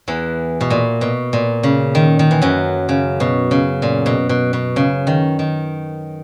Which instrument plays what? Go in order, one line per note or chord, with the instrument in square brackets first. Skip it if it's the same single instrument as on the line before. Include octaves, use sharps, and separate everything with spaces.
[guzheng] E2 E3
B2
A#2
B2
A#2
C#3
D#3
D#3
E3
F#2 F#3
C#3
B2
C#3
A#2
B2
B2
B2
C#3
D#3
D#3